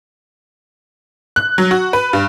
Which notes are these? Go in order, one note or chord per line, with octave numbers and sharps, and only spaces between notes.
F#6
F#3
F#4
B4
G2